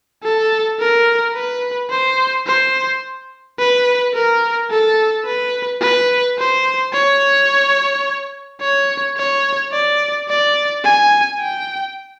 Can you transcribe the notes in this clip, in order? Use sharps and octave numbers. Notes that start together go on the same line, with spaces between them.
A4
A#4
B4
C5
C5
B4
A#4
A4
B4
B4
C5
C#5
C#5
C#5
D5
D5
G#5
G5